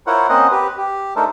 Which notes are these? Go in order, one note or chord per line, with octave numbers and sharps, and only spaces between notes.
E4 F4 A#4 C5 C#5 F#5
A#3 C4 C#4 C5 D#5 F#5
G4 B4
G4
A3 D4 D#4 A4 A#4 C5